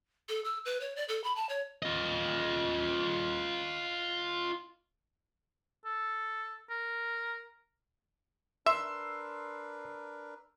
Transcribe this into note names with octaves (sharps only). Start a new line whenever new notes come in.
A4
E6
B4
C#5
D5
A4
B5
A5
C#5
F4 D#5
A4
A#4
D4 A#4 B4 E5 C6 E6